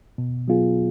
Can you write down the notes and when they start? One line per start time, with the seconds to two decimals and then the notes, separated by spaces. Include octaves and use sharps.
0.18 B2
0.48 F#3 B3 F4 G#4